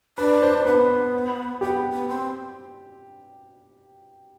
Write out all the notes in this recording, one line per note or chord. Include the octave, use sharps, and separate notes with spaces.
D4 B4
C5
B3 B4
B3 G4
B3
C4